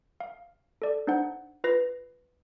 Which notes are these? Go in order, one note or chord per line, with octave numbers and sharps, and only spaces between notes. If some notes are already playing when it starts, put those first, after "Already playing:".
F5
A4 D5
D4 D#4 C5 F#5
F4 B4 A#6